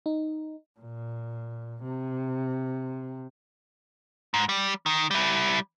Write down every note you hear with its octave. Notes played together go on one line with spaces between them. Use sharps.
D#4
A#2
C3
G#2
G3
D#3
G3 E4